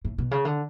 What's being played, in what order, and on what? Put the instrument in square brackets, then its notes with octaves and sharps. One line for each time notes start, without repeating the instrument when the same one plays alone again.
[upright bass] A2
B2
C#3
D3